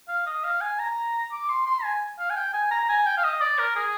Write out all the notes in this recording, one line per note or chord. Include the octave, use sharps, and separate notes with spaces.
F5
D#5
F5
G#5
A#5
D6
C6
C6
G#5
F5
G#5
G5
G#5
A#5
G#5
G5
F5
D#5
D5
A#4
G#4